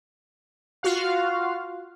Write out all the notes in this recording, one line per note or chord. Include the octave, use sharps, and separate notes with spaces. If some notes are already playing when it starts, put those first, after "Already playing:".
F4 F#4 F5